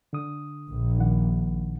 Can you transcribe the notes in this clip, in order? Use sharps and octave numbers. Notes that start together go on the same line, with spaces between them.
D3 D#6
A#1
D#3 F#5